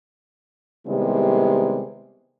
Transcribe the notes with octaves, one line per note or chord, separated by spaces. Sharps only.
C3 D#3 G3 G#3 B3 E4